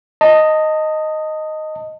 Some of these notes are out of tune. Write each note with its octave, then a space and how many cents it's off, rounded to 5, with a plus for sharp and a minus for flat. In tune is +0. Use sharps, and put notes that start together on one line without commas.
D#5 +0 A5 +30